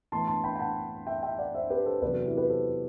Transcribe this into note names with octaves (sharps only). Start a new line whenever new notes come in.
A2 E3 B3 A5 C6
A5 C6
G5 B5
G5
F#5 A5
E5 G5
E5 G5
D5 F#5
C5 E5
G4 B4
A4 C5
E2 C3 F#3 C4 B4 D5
F#4 A4
E4 G4
G4 B4
A4 C5